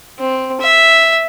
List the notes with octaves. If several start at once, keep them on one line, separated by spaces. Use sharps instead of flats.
C4
E5